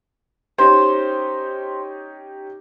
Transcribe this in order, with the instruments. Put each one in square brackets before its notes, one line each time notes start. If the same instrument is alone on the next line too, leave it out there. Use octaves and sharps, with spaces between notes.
[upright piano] C#4 D#4 G4 [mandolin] C5